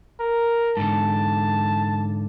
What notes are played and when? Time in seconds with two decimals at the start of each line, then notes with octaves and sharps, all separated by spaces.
0.20 A#4
0.77 G#2 D3 A5